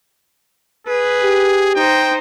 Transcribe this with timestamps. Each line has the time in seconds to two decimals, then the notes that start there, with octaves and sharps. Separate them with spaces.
0.87 G#4 B4
1.23 G4
1.75 D#4 C5 G5